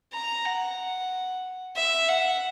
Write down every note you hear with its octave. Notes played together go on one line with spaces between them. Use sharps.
A#5
F#5
E5
F#5